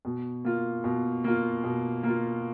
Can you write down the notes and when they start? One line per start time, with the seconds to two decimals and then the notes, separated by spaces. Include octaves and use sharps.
0.05 B2
0.44 A#3 F4
0.84 B2
1.24 A#3 F4
1.64 B2
2.03 A#3 F4